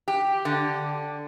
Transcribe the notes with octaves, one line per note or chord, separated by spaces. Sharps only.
G4
D3